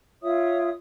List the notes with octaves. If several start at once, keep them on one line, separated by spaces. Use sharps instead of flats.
F4 C#5 E5 D#6